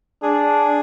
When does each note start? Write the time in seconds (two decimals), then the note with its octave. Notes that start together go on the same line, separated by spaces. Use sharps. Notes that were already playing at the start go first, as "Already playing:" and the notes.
0.23 D4 G#4